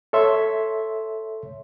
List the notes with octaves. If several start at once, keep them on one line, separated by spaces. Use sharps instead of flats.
A4 C#5 E5 C6